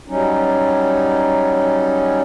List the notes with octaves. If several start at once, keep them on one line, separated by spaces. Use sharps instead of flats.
F#3 G3 C#4 D#4